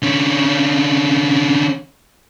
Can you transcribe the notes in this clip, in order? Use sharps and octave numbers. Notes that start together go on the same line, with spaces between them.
D3 C#4